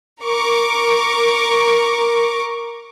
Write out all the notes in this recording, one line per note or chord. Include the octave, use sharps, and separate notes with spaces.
A#4 C#6 D6